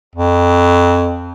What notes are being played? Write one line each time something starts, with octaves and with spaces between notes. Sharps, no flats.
F2